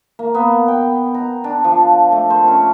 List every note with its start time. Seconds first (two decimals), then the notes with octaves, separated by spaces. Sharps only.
0.19 A#3
0.34 B3
0.68 G5
1.14 A#5
1.44 D4
1.64 F3
2.12 A3
2.30 C5
2.48 C#4